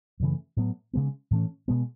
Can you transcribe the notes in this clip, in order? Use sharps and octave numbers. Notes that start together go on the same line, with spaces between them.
F#2 C#3 E3 A3
A2 F#3 B3
C#3 G#3 B3
A2 E3 A3 C#4
B2 G#3 B3